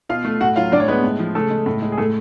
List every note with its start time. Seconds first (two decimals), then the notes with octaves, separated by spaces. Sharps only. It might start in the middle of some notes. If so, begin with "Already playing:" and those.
0.09 B2 F4 F5
0.25 A3
0.40 A2 F#4 F#5
0.56 F#3 F4 F5
0.72 A2 D4 D5
0.80 C#5
0.88 G#3 B3 B4
1.04 A2
1.19 F3
1.35 C#3 A3 A4
1.50 G#3
1.66 A2
1.82 G#3
1.92 G#4
1.98 A2 A3 A4